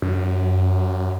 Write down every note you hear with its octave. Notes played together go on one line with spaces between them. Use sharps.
F#2